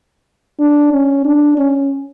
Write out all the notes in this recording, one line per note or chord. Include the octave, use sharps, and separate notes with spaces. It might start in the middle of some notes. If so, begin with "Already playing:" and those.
D4
C#4
D4
C#4